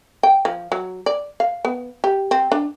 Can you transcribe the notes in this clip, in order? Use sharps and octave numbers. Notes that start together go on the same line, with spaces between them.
G5
F3
F#3
D5
F5
B3
G4
C4
D4